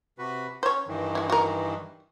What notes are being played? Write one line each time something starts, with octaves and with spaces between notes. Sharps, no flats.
C3 F#4 B4
C#4 C5 C#5
G2 D#3 E3
C#4 E4
F#4 A#4